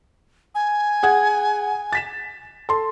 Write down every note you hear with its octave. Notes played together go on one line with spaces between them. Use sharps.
G#5
G#4 F#5 G#6
A6 B6 E7
A4 C6